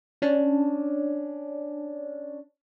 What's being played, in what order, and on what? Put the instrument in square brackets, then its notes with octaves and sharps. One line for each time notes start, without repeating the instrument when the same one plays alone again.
[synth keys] C#4 D4